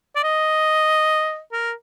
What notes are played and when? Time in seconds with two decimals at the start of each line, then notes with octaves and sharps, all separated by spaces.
0.16 D5
0.23 D#5
1.53 A#4